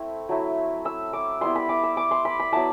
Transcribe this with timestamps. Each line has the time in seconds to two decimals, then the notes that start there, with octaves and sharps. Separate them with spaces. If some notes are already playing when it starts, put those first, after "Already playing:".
Already playing: A3 C4 E4
0.29 F#3 A3 E4
0.85 E6
1.13 D6
1.41 G3 B3 E4 C6
1.55 B5
1.69 D6
1.83 E6
1.97 D6
2.11 C6
2.25 B5
2.40 B5
2.53 F#3 B3 E4 A5